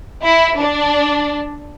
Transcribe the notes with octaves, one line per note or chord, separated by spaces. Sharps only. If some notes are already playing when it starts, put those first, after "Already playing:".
E4
D4